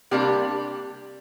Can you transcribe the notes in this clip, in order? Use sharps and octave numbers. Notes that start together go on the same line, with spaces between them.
C3 G3 A#3 D4 G4